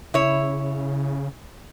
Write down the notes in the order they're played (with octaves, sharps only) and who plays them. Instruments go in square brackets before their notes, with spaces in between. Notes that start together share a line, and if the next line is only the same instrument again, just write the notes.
[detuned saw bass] C#3 [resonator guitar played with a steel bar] E4 C#5